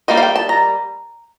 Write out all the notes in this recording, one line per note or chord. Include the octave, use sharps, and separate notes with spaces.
G3 A#3 D#4 D#5
F5
G5
A5
A#5